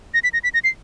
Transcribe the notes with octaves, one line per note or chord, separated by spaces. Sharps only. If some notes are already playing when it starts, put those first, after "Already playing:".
A#6
B6
A#6
B6
A#6
C7